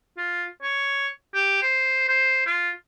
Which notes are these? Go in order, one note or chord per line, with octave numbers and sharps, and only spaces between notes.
F4
C#5
G4
C5
C5
F4